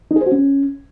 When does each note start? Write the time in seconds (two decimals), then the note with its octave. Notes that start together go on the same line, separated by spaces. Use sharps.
0.11 D#4
0.16 G#4
0.21 C5
0.26 F#4
0.32 C#4